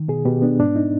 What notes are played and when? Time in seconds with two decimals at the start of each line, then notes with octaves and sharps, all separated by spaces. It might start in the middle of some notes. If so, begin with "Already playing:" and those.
Already playing: D#3
0.08 B2 G#4
0.25 B2 G4
0.42 B3 D4
0.59 G#2 D4
0.76 D#4